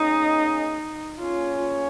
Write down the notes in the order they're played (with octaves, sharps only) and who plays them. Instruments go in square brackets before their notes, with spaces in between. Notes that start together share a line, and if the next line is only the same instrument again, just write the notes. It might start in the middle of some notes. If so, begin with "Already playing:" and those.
Already playing: [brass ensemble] A#3 C#4 G#4 D#5 [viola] D#4
[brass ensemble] A#3 C#4 G#4 C#5 [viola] F4